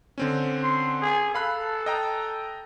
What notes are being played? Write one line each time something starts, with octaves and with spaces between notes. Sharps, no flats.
D3 C4 C#4
C6
G#4
A4 F5 B5 F#6
D#5 G5 A#5